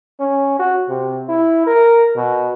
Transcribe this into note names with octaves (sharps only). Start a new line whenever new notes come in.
C#4
F#4
C3
E4
A#4
B2